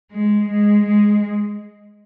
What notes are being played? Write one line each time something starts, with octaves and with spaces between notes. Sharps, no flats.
G#3
G#3
G#3